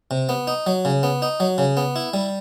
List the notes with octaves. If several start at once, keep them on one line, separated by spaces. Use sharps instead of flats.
C3
B3
D#4
F#3
C#3
B3
D#4
F#3
C#3
B3
E4
G3